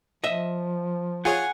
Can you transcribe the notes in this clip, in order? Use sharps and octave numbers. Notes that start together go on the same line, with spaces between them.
F3 D#5 E5
F4 G#4 C#5 F#5 G#5